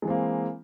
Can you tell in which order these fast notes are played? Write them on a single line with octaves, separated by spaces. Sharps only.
G#3 E3 C4 A#3